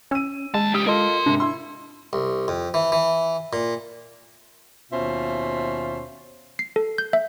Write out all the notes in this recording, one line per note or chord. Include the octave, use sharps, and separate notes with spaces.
C#4 E6 D#7
D#2 G#3 A5
C#2 G4 D#6
F4 A4 A#4 D#5 C6
G#2 C3 D4
E4 C6
C2
F2
E3
E3
A#2
D#2 B2 C#4 F4 C5 E5
C7
A4
G6
E5